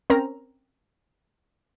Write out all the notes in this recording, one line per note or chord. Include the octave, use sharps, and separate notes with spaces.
C4 C#4 A#4 A#5